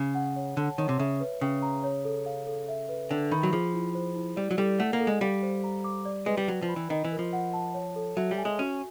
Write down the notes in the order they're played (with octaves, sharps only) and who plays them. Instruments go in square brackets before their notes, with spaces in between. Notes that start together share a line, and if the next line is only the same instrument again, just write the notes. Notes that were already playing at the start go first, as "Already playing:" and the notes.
Already playing: [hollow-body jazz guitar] C#3
[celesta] F#5
C#5
[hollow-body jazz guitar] D3 [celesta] A5
[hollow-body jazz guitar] D#3 [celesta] C#5
[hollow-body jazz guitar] C3
[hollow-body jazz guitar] C#3 [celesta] E5
[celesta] B4
[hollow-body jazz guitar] C#3 [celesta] G5
[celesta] A#5
C#5
A4
F5
A4
E5
B4
[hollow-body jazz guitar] D3 [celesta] G5
[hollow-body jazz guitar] D#3 [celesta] B5
[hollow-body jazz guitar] F#3
[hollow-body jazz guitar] F3 [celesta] G#4
[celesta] E4
C5
E4
[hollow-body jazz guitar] G3 [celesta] D5
[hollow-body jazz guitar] F#3
[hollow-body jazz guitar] G3 [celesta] A4
[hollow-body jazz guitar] A3 [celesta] F#5
[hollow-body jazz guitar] A#3
[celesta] A4
[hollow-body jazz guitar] G#3
[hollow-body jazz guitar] G3 [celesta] F5
[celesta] C5
A#5
D6
D5
[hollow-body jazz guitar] G#3 [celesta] B4
[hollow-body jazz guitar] G3
[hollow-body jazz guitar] F#3 [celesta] G5
[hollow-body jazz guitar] F3
[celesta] B5
[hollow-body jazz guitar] E3
[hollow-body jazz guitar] D#3 [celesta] D#5
[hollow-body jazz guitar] E3
[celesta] A#4
[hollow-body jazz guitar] F3
[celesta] F#5
A5
C#5
A4
[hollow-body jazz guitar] F#3 [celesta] E5
[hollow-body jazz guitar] G3
[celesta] G#5
[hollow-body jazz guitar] G#3
[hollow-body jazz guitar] C#4 [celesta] F#4